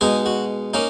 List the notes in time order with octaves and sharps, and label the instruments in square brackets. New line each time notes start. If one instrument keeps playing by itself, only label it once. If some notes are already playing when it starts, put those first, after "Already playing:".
[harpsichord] B2 G#3 D#4 G#4
F#4
A#3 C#4 D#4